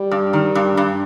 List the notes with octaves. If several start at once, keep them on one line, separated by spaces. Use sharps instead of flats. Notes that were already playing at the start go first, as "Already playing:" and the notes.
Already playing: G3
G2
D#3
G2
G2